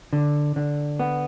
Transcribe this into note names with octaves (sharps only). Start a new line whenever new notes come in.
D3
D3
B3